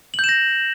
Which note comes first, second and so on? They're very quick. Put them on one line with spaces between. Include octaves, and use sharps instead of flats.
F#7 G6 E7 A#6